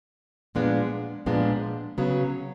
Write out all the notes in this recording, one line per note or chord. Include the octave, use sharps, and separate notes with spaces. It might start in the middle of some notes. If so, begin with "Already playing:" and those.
A#2 F3 G#3 B3 D4
A#2 F3 G#3 B3 D4
C#3 F#3 B3